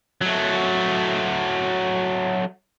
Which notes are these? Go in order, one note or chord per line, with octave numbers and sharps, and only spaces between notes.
F#3 A3